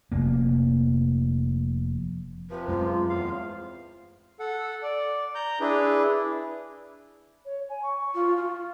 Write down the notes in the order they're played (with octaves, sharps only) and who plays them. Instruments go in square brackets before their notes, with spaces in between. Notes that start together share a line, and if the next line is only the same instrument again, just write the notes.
[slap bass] F1 A#3
[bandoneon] C3 F3 [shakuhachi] B4
[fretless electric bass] F#2 G#3 [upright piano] C4 [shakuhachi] F4
[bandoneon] E2 A2 F5
[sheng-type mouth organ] A4 F#5
D5
A#5 G6
D4 E4 G#4 B4
[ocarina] C#5
G#5
C#6
[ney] F4
F4